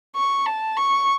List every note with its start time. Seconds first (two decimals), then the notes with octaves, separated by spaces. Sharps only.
0.16 C#6
0.46 A5
0.77 C#6